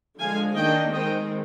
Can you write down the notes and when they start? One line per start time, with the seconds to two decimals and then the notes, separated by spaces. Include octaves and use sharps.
0.20 D3 F3 G#3 F5 G#5
0.56 D#3 A#3 D4 D#5 G5
0.92 D#3 G#3 C4 D#5 G5